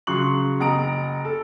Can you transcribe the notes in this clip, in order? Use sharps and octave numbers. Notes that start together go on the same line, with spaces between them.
C#3 F#3 C6 C#6 F#6 F#7
F#1 F#5 A#5 D#6 D7
A4